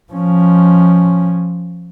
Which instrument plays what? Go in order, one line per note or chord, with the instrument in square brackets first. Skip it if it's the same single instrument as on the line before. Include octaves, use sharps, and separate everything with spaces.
[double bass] F3 C#4